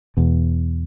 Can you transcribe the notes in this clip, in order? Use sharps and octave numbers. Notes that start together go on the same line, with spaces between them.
E2 B2